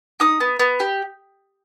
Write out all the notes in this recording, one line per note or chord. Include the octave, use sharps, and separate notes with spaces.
D#4 D#6
B3
B3
G4